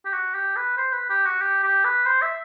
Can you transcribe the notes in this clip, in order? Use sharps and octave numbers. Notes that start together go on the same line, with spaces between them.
G4
F#4
G4
B4
C5
B4
G4
F#4
G4
G4
B4
C5
E5